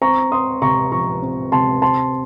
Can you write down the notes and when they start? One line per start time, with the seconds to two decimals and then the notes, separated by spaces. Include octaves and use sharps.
0.01 C4 A#5 C#6
0.31 C4 C6 D#6
0.62 C3 A#5 C#6
0.92 F3 A#5 C#6
1.22 C4
1.52 C3 A5 C6
1.82 C4 A5 C6